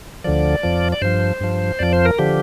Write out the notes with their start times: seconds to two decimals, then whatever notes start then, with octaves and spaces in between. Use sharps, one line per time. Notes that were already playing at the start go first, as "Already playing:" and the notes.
0.24 D2 D3 F3 D5
0.63 F2 F3
0.92 D5
1.01 G2 F3 C5
1.41 G2 F3
1.79 F2 F3 D5
1.93 C5
2.05 A#4
2.19 D3 F3 G4